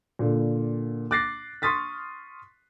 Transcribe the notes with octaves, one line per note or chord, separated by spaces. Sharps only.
A#2 D3
D6 F#6 A6 A#6 C7
C6 C#6 D#6 F6 A6 B6